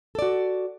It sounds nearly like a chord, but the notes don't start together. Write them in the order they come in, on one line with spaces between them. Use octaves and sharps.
A4 D5 F#4